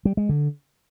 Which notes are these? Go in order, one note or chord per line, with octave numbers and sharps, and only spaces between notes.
G3
G#3
D3